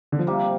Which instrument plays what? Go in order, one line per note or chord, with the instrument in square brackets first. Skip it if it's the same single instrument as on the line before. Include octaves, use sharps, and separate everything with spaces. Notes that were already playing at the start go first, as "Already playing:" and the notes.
[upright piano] D3
F3
[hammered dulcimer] C3 A#3 G4 [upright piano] G3